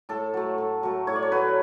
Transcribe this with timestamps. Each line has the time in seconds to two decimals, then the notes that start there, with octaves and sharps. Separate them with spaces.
0.09 A2 A4
0.34 F#3 A3
0.58 A2
0.83 F#3 A3
1.07 A2 C#5
1.15 D5
1.22 C#5
1.32 F#3 A3 B4